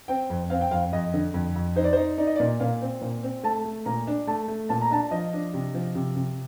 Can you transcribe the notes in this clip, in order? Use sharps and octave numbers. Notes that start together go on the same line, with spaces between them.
C4 G5
F2
C4 F5
G5
F2 F5
F2 D#5
D3
F2
F2
D#4 C5
D5
C5
D#4
D#4 D5
D#5
D5
A#2
A#2 F5
C4
A#2
C4
A3 A5
A3
A#2 A#5
D4
A3 A5
A3
A#2 A5
A#5
D4 A5
F3 D#5
D4
C3
F3
C3
C3